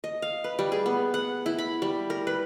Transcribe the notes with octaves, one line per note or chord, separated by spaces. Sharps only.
D#5
F5
B4
G3
G#4
B3
F#5
E4
B5
G3
A#4
B4